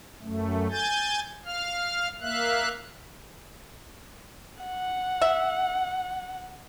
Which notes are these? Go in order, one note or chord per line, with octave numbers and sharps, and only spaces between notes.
F#2 A3
G#5 G6 A6
F5 F6
A#3 E5 F5 F#6
F#5
E5